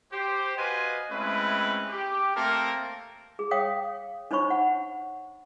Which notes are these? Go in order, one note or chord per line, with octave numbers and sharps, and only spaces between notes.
G4 C5
F#4 B4 C5 D#5 F5 G#5
G#3 A3 C4 C#4 E4 B4
G4
A3 A#3 C4 A4 A#4
G#4
C#5 F5 G5 D#6
D4 D#4 C5 C#5 B5 C#6
F#5